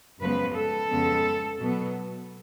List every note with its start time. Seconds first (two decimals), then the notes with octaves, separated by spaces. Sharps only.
0.20 F#2 C#3 F3 G#3 B3 B4
0.55 A4
0.90 F2 C#3 G#3 B3
1.60 B2 F#3 B3